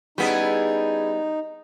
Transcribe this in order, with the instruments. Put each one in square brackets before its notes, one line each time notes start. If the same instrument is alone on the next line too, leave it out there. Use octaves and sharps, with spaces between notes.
[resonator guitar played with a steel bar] G3 B3 [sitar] C#4 E4 G#4 [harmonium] D#4